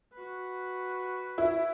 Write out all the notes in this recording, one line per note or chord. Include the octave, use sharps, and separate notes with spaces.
F#4 B4
E4